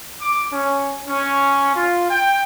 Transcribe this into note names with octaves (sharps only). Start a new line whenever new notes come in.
D6
C#4
C#4
F4
G5